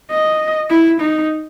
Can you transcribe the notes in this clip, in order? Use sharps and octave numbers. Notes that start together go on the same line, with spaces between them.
D#5
E4
D#4